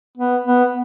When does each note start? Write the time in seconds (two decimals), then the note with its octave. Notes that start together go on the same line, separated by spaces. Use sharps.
0.18 B3
0.45 B3